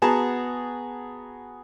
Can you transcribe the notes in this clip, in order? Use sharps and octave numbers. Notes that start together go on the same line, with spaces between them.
B3 F#4 G#4 A5 A#5